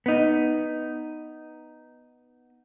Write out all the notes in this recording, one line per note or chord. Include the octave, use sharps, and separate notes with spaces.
B3 D#4